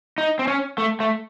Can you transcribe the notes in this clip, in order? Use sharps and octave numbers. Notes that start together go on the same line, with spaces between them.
D#4
C4
C#4
A3
A3